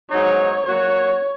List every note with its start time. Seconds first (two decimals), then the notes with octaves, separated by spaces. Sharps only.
0.11 G#2 F#3 D#4 C#5
0.67 F#3 A#3 F#4 C#5